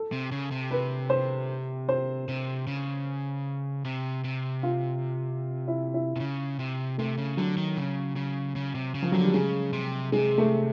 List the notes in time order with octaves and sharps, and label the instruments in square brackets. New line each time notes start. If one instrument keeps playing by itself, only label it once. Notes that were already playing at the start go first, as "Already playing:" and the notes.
Already playing: [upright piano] A4
[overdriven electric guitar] C3
C#3
C3
[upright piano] B4
C5
C5
[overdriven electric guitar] C3
C#3
C3
C3
[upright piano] F4
E4
E4
[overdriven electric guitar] C3
C#3
C3
[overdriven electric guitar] C3 [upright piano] A3
[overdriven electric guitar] C#3
[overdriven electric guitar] D3 [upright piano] F#3
[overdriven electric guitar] D#3
C#3
C#3
C#3
C3
C#3
[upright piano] F3
[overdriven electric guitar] D3 [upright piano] F#3
[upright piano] G3
[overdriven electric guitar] C#3 [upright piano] G#3
[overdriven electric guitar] C3
[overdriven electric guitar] C3 [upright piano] G#3
[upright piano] A3